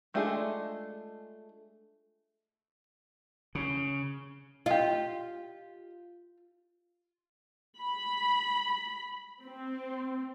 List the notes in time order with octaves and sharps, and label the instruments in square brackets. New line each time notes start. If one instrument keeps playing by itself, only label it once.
[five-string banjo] G#3 A3 D4 F4 G#4
[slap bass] C#3
[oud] F4 [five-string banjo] G4 D#5
[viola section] B5
C4